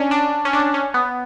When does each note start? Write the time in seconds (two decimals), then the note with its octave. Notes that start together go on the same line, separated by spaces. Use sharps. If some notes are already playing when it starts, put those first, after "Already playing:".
Already playing: C#4 D4
0.11 D4
0.45 C#4
0.53 D4
0.74 C#4
0.94 B3